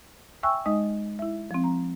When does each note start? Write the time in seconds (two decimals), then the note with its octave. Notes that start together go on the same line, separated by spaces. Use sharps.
0.43 E5 G5 G#5 C#6 E6 F#6
0.65 G#3 D#4 D#5 D#6
1.19 E4 E5
1.51 F3 C4
1.64 A#5